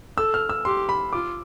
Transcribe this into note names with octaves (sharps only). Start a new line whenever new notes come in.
A4 E6
F6
E6
G4 C6
B5
F4 D6